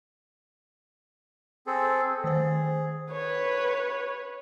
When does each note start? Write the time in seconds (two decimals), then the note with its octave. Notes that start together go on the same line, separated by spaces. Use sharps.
1.67 C4 G#4 A4
2.24 D#3 G#4 C5
3.11 B4 C#5